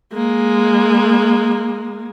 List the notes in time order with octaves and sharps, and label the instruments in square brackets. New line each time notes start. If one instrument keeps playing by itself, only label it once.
[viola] G#3 A#3